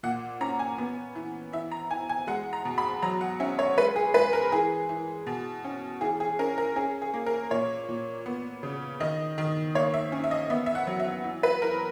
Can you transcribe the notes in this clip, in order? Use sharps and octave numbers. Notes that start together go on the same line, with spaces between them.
A#2 F#5
C#4 A#5
G#5
B3
E3
E3 E5
A#5
E3 G#5
G#5
G#3 F#5
A#5
B2
B5
F#3 A#5
F#5
C#4 E5
C#5
G#3 B4
G#4
G#3 B4
A#4
E3 G#4
E3
B2
C#4
E3 G#4
G#4
C#4 A#4
A#4
C#4 G#4
G#4
A#3
A#4
A#2 C#5
A#2
B3
C#3
D#3 D#5
D#3
A#3 C#5
E5
C#4
E5
D#5
B3 E5
E5
F#5
F#3
E5
E3
B4
E3 A#4